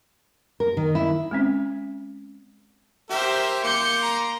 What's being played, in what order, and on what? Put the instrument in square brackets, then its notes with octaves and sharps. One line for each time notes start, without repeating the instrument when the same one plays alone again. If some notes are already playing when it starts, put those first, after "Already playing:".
[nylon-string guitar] A#4
D#3
E4
[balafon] G#3 C4 C#4
[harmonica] G4 A#4 [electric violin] C5 E5
[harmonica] A#3 C6 D6 [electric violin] G6 C#7
[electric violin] A#5